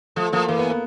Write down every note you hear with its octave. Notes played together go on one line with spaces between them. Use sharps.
F3 A3
F3 A#3
E3 A#3
B3
B3